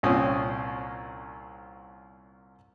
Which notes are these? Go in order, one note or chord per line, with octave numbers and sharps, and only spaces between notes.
C2 A#2 C4 C#4 D#6